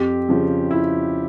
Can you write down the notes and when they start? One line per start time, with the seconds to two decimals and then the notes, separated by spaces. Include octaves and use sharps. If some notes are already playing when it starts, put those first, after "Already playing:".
Already playing: F2 G4
0.29 C#3 F3
0.71 E4